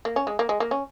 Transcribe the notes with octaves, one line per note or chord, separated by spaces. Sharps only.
A#3
C#4
G#3
A#3
G#3
A#3
C#4